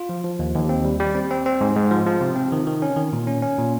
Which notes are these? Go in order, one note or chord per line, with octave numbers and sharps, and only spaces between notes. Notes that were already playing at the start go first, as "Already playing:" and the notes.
Already playing: F4
F3
F3
D#2
D#2
C4
G3
G3
C4
C4
C4
G#2
G#2
F3
F3
C3
C4
D#3
D#3
C#4
D#3
A#2
C#4
C#4
A#2